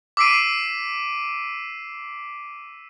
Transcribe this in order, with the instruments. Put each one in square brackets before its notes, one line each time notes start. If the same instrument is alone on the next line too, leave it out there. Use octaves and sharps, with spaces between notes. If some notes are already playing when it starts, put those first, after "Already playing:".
[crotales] D6 E6 B6 C7 D7 D#7